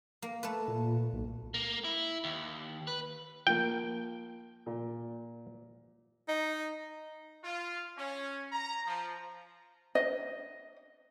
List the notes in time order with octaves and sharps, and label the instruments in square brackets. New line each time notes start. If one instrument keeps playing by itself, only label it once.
[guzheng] A#3
A3 B4
[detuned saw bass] A#2
B1
[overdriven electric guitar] A#3
E4
D#2
B4
[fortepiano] F3 A#3 [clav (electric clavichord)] G5
[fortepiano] A#2
[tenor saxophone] D#4
[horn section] F4
C#4
A#5
F3
[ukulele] D#5